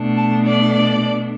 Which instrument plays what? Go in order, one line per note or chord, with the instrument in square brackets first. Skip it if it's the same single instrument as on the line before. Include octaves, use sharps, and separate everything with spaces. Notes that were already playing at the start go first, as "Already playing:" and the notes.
Already playing: [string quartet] B2 A3 D4
A5
D5